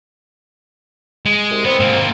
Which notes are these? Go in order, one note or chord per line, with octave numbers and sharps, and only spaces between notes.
G#3
C2
B3 C4
G#2 A#3